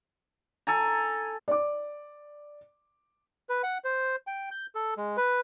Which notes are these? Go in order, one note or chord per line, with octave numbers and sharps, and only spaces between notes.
A4 G#5 A#5
D5 D6
B4
F#5
C5
G5
G6
A4
G#3
B4